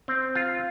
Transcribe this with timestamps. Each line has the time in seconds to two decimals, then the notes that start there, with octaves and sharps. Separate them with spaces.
0.08 C4
0.35 F4